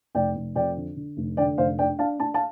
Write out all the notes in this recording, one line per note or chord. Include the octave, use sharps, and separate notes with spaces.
F1 D5 G5
F1
F2 D5 G5
D3
D3
F1
D3 D5 G5
F1 C5 F5
D4 D5 G5
D4 F5 A5
D4 A5
F5 A5